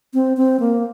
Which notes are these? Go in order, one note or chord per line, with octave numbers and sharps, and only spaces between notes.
C4
C4
A#3